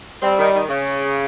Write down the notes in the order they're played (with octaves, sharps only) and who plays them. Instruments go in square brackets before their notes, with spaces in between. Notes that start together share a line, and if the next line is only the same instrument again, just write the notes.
[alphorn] G3 [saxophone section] C4
[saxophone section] D#3
D#3
C#3